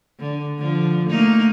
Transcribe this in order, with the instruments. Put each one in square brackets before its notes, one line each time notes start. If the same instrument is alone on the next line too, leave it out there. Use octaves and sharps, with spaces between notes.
[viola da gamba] D3
D3 F3
A3 A#3 D#4